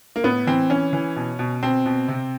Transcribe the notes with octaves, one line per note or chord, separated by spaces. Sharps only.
A#3
A2 B3
E3 C4
E3 C#4
E3
B2
B2
B2 C4
B2
C3